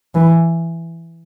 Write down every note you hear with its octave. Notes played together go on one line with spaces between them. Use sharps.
E3